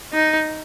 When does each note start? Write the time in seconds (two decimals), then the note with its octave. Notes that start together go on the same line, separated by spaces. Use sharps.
0.13 D#4